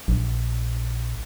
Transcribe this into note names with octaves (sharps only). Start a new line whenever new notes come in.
A#1